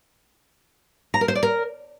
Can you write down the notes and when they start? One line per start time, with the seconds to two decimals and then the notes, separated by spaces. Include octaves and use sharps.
1.14 A#5
1.21 A#4
1.28 C5
1.35 D5
1.43 A#4